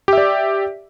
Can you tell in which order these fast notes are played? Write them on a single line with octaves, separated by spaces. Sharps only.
G4 E5 D5